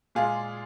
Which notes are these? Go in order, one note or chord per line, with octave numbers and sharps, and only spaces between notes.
A#2 G#3 F4 G#4